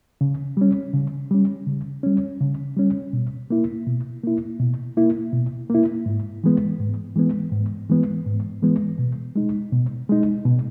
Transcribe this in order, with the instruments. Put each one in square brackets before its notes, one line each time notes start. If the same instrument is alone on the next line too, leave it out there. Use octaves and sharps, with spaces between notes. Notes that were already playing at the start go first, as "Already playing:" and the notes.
[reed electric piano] C#3
G3 C#4
C#3
G3 C#4
C#3
G3 C#4
C#3
G3 C#4
B2
A#3 E4
B2
A#3 E4
B2
A#3 E4
B2
A#3 E4
G#2
E3 G#3 B3
G#2
E3 G#3 B3
G#2
E3 G#3 B3
G#2
E3 G#3 B3
B2
G#3 D#4
B2
G#3 D#4
B2